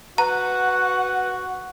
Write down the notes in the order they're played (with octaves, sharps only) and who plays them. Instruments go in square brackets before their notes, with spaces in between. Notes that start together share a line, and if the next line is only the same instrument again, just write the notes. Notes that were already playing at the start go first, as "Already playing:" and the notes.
[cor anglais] F#4 [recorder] B4 [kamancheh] F#5 [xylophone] A#5